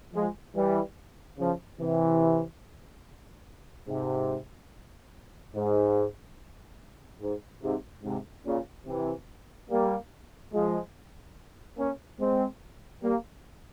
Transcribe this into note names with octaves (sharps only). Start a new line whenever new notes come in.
F3 G#3
E3 G3
C#3 F3
C3 E3
G#2 C3
G#2
G#2
G#2 C3
G#2 C3
A#2 C#3
C3 E3
G3 A#3
F3 G#3
A#3 C#4
G#3 C4
G3 A#3